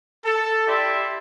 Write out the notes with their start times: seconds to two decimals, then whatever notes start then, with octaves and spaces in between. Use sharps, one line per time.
0.25 A4
0.67 E4 G4 D5 E5 C6